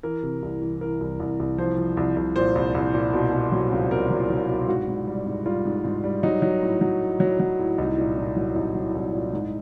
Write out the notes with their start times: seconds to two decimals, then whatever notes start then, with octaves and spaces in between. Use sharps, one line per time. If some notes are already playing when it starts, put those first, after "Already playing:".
0.03 E3 A#4
0.23 C3
0.42 C2
0.62 E3
0.81 E3 A#4
1.00 C2
1.20 C2
1.39 C2
1.58 F3 C5
1.78 F3
1.97 C2
2.16 C2
2.36 A#2 C5
2.55 C2
2.75 C2
2.94 A#2
3.13 B2
3.33 B2
3.52 F#3
3.72 C#2
3.91 B2 A#4
4.10 F#3
4.17 F4
4.30 F#3
4.49 B2
4.68 G#2 F#4
4.88 G#2
5.07 G3
5.26 G#2
5.46 G3 F4
5.65 G#2
5.84 G#2
6.04 G3
6.23 F#3 D#4
6.42 F#3
6.62 A2
6.81 F#3
7.01 A2
7.20 F#3
7.40 F#3
7.59 A2
7.78 C2 D#4
7.98 A#2
8.17 A#2
8.36 F#3
8.56 C2 D#4
8.75 F#3
8.95 C2
9.14 A#2
9.33 G#2